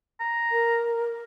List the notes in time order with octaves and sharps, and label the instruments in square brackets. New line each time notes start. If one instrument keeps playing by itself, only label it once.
[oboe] A#5
[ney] A#4